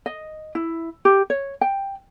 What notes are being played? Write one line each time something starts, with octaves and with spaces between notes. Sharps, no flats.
D#5
E4
G4
C#5
G5